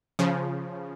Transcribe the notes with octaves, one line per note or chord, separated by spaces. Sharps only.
C#3 F3